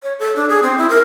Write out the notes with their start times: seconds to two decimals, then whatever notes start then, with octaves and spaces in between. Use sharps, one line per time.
0.03 C#5
0.19 A4
0.36 D4
0.49 G#4
0.63 C4
0.78 E4
0.90 A#4